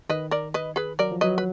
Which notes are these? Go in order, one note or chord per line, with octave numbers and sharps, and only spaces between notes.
D#3 B4 D#5
A#4 D5
B4 D#5
G#4 B4
F#3 A#4 D5
F3
F#3 B4 D#5
B4